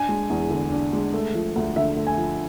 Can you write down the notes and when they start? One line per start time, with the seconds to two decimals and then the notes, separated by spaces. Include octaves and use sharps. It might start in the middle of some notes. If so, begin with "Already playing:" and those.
Already playing: D4 G#5
0.09 G#3
0.30 E2
0.50 D3
0.72 D4
0.93 G#3
1.14 A3
1.34 F3
1.56 D2
1.76 D3 E5
1.97 A3
2.07 G#5
2.17 F3